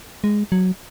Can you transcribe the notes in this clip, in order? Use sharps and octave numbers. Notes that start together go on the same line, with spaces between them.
G#3
F#3